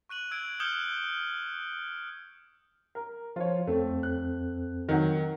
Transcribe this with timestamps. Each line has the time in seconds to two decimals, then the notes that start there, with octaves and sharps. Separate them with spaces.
0.09 C#6 F#6 D#7 F#7
0.31 E6 G#6 D7
0.60 D#6 F6 G6 G#6 C#7 G7
2.95 A#4
3.36 F3 F4 C#5
3.67 F2 A3 C4 A4
4.03 F#6
4.89 D#3 F#3 F#5